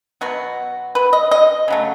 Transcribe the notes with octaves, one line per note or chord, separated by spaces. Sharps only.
B2 F#3 B3 F#4
B4
D#5
D#5
C#3 F#3 A3